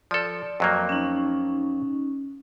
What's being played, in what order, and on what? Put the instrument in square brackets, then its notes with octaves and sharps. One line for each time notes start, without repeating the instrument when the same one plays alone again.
[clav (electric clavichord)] F3 A4 [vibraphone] D5
[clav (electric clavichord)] F2 F#3 A#3
[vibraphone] C#4 D#4